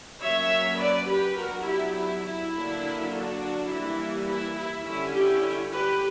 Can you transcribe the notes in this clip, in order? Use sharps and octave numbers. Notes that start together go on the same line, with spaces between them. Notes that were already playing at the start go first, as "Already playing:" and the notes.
F#3 A#3 C#4 C#5 E5
B4 D5
G4 B4
F#3 B3 D4 F#4 A#4
E4 G4
E4
E4
D3 F#3 A#3 D4
D4 F#4
E3 G3 A#3 E4
E4
E4
D3 G3 C#4 E4
E4 G4
G4 B4